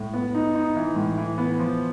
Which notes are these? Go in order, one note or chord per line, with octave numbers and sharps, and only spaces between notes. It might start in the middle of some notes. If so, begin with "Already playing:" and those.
Already playing: A2
B3
D#4
D#4
E3
A2
E3
B3
F3